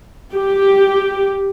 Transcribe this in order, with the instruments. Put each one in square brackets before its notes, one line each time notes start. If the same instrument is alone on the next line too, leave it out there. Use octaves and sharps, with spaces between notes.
[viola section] G4